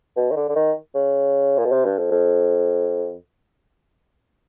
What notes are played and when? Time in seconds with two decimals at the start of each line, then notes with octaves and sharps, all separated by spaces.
0.17 B2
0.31 D#3
0.36 D3
0.49 D3
0.55 D#3
0.95 C#3
1.58 A#2
1.65 B2
1.72 C3
1.85 G2
1.99 F2
2.11 F2